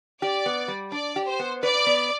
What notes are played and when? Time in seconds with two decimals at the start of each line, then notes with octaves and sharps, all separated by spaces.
0.22 G4 D5
0.46 B3
0.68 G3
0.92 D4 D5
1.16 G4
1.27 C5
1.39 B3
1.62 B4 D5
1.86 B3